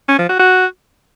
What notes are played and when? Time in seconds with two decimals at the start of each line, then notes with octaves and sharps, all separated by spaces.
0.09 C#4
0.19 F3
0.29 F#4
0.39 F#4